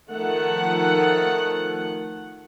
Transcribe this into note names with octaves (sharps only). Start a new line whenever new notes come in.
D#3 F3 A3 F#5